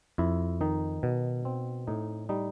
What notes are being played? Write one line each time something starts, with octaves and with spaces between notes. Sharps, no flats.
F2 E4
D#3 D#4
B2
C4
A2 D#4
G3 D#4